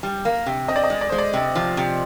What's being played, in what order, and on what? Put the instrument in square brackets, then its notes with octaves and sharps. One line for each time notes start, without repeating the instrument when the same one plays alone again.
[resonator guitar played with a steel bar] G3
A#3
C3
[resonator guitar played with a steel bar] C4 [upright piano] D#5
[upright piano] D5
D#5
[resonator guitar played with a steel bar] G#3
[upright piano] D5
[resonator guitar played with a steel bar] G#3 [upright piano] C5
[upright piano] D5
[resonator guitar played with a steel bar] C3
F3
C3